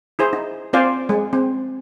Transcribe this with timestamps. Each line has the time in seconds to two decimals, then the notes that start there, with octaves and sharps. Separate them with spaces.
0.19 E4 G#4 C5
0.33 D#4
0.73 C4 F4 C5 D5 F5 G#5
1.09 G#3
1.33 C4